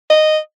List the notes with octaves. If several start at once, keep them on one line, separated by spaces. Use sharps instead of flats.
D#5